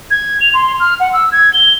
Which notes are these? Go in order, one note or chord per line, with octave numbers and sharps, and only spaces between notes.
G#6
F7
C6
F6
F#5
E6
G#6
G7